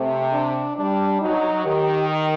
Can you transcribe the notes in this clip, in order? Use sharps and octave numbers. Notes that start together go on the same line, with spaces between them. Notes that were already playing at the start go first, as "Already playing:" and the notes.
Already playing: C3 A3
D4
G3 D4
F#3 D#4
D#3 G4